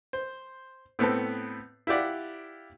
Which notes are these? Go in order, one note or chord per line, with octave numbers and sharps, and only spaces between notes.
C5
A2 B3 C4 A4
E4 F4 G4 D5 F#5